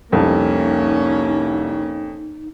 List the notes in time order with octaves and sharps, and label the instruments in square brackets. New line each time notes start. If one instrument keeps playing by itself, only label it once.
[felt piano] C2 C3 [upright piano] F2 [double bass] A#3 C#4 [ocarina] D#4